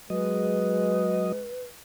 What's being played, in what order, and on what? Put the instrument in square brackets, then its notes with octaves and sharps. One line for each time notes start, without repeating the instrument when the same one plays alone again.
[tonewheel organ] F#3 D#5 [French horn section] G#3 [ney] B4